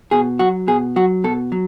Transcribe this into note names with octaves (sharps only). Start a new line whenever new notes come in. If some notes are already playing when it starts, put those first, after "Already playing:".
B2 G#4
F#3 F#4
B2 G#4
F#3 F#4
B2 A4
F#3